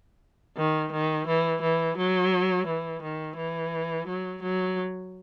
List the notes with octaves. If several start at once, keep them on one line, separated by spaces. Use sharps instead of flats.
D#3
D#3
E3
E3
F#3
E3
D#3
E3
F#3
F#3